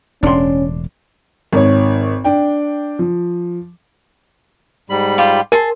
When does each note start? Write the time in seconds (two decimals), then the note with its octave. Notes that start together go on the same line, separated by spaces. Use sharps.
0.23 E1 A2 C#4 D4 C6
1.53 G#1 C#5
2.24 D4 G5
2.99 F3
4.90 G#2 G3 B5
5.18 F4 G4
5.52 G#4 A#4 A5 C6